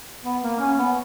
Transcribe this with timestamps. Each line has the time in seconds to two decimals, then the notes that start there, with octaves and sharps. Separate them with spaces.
0.25 B3
0.43 A#3
0.59 C#4
0.78 B3